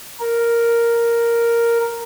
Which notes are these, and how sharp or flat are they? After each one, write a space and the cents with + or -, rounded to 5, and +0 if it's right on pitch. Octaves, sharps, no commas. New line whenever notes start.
A#4 +0